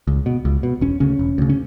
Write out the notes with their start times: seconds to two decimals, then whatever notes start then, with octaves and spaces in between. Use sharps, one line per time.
0.07 C#2
0.26 B2
0.45 C#2
0.63 B2
0.81 E1 C#4
1.00 D2 C#3 C#4
1.19 E1
1.38 D2 C#3
1.50 C#4